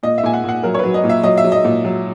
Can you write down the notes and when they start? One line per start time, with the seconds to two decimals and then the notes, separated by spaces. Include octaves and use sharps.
0.03 A#2 D#5
0.18 E5
0.23 A#2 G#5
0.33 F#5
0.44 A#2 F#5
0.63 F#3 A#4
0.74 C#5
0.79 F#3 B4
0.94 D#5
1.04 A#2
1.09 E5
1.23 F#3 D#5
1.37 E5
1.44 F#3
1.52 D#5
1.64 A#2
1.85 F#3